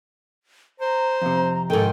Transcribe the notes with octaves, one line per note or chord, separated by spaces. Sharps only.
C5 A#5
F2 C3
G#2 D#3 A4 G5